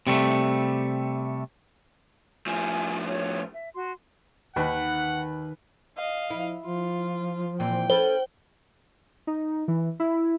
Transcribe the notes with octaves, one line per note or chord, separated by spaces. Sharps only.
C3 G3 A3
A2 F3 G#5
C#5
E5
F#4 C6
D#2 D#3 B4 F#5 B5
D#5 F5
F3 E4
F3 F4
A#2 E3 C4 G5
C#4 A4 B4 C5
D#4
E3
E4